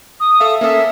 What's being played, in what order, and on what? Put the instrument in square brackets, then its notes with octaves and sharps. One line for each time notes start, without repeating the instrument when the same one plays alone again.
[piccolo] D#6
[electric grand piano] A4 E5 F5
[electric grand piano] A#3 C#4 A4 [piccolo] E5